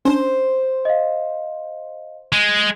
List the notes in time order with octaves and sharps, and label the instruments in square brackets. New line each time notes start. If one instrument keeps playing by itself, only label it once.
[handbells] C#4 D4 [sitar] C5
[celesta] D#5 F5
[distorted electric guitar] G#3